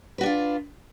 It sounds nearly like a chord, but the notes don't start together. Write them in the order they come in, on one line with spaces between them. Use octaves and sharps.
B4 F#4 D4 F4